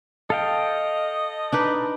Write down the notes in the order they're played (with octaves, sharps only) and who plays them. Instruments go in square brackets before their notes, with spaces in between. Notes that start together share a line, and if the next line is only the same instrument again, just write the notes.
[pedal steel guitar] A4 F5 G5 [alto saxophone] D#5
[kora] D4 D#4 B4